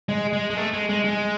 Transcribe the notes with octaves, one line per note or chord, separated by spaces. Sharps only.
G#3
G#3
G#3
A3
G#3
G#3
G#3